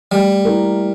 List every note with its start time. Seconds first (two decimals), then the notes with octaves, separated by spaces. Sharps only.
0.11 G3 A3
0.45 E4 A#4